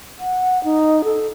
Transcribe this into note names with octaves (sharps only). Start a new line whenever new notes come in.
F#5
D#4
A4